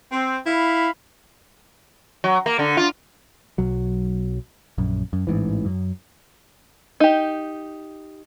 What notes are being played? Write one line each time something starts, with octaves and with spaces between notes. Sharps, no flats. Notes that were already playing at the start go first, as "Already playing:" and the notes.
C4
E4 F5 B5
F#3
A#3
D3
F4
B1 F#3
A#1 F#2
F#2
A1 G#2 E3
F#2
D#4 G4